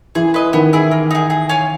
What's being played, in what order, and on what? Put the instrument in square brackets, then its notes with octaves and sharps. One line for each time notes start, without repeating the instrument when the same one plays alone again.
[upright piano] E3 [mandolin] G#4
[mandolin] B4 D#5
[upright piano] D#3 [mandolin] B3
[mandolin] E4 G#4
A#3
D#4 G#4
G#4
C#5 F5 G#5